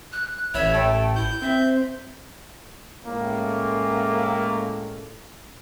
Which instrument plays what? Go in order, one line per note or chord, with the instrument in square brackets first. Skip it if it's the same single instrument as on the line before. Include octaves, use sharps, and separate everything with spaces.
[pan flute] F#6
[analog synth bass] A1 [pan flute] C#5 [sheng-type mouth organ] E5 B5
[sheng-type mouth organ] A3 A4 [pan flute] G5
[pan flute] E4 [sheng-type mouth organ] G6
[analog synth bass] C4 [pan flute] E5
[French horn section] A2 G#3 C#4 [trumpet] A#3